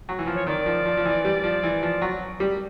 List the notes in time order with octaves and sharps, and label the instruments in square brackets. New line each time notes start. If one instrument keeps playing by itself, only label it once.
[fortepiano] F#3
E3
F3
[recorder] C#5
[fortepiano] D#3 [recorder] D5
[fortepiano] F3
F3
F3
E3
G3
F3
E3
F3
F#3
G3